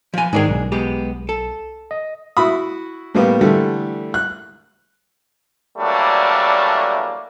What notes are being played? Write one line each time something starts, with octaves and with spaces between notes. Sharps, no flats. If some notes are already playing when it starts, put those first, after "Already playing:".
F3 G#5
G#2 D#3 G#3 D4 G#4
B1
G#3 B3 G4
A4
D#5
E4 F#4 B5 D#6
A2 G3 A#3 B3
D3 E3 G3 A3
F#6
E3 F#3 G3 A3 A#3 D4